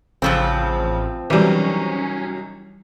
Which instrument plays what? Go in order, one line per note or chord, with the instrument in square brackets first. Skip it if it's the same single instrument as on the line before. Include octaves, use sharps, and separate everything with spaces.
[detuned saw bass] A1 [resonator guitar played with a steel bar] F2 F3 C4 [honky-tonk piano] C#3
[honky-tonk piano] C2 D#3 F#3 [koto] E3 G3 [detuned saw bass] C#4